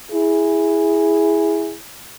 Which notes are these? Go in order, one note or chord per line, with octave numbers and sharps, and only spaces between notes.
E4 G#4